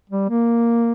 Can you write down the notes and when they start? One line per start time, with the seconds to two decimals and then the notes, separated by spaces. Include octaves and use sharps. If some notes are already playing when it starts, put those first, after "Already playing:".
0.10 G3
0.30 A#3